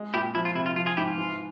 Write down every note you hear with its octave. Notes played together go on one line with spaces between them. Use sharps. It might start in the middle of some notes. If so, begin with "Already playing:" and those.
Already playing: G#3
A#2 E4 G4
F3 E4
F4
C3 E4
F4
F3 F4
F4 G#4
G#2 E4 G4
F4
E3